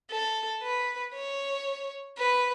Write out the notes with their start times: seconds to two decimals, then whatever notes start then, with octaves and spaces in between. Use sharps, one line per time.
0.11 A4
0.63 B4
1.15 C#5
2.18 B4